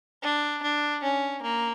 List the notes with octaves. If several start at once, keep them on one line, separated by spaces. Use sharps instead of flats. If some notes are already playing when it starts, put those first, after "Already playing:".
D4
D4
C#4
A#3